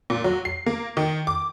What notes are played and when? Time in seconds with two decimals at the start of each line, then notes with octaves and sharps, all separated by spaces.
0.10 A#2
0.24 F#3
0.45 C7
0.66 A#3
0.97 D#3
1.27 D6